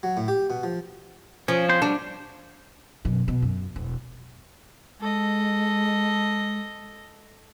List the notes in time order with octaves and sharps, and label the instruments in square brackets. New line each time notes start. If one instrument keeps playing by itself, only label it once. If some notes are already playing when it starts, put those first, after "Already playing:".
[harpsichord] F#3
A2
G4
B2
F3
[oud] F3 [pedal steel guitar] C#4
[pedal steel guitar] C4 C#4 C5
[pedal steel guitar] G3 F#4 [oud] D4
[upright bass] F#2 B2
B2
F#2
E1
[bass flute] G#3 [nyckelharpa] A4 D#5